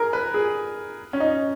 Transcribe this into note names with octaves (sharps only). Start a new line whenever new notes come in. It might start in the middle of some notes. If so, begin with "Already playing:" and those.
Already playing: G#4 A#4
B4
G#4
C#4
D#4